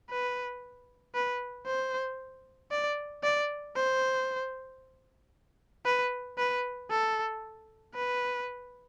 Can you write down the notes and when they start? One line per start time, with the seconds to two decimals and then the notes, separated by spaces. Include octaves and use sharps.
0.10 B4
1.15 B4
1.66 C5
2.71 D5
3.24 D5
3.76 C5
5.86 B4
6.38 B4
6.90 A4
7.95 B4